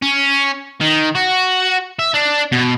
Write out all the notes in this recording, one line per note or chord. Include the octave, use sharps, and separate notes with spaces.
C#4
D#3
F#4
E5
D4
B2